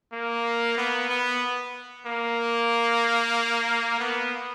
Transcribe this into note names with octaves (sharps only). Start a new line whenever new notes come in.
A#3
B3
B3
A#3
B3